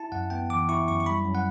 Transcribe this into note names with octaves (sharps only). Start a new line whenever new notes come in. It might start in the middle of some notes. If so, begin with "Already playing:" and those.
Already playing: E4 A5
F#2 F#5
B3 G5
E3 D6
E4 C#6
F#2 C#6
C#6
G3 B5
F#2
F#5